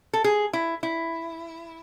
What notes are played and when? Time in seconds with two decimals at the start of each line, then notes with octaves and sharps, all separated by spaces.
0.13 A4
0.24 G#4
0.53 E4
0.83 E4